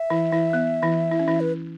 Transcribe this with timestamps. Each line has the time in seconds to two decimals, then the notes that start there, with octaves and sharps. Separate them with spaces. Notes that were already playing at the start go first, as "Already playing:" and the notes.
Already playing: E5
0.10 E3 E4
0.32 E3 E4
0.53 B3
0.82 E3 E4
1.12 E4
1.19 C#4
1.28 E3 E4
1.40 B4